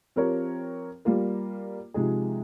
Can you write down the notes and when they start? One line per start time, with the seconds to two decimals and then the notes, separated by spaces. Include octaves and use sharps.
0.16 F3 C4 G4 A#4 C#5
1.05 G3 A#3 F4 A#4
1.94 C3 F3 G#3 D#4 G#4